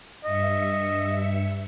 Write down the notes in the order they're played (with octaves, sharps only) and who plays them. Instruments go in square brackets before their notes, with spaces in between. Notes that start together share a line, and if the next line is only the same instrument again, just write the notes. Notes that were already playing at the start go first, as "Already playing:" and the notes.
[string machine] G2 E5 C#7 [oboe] D#5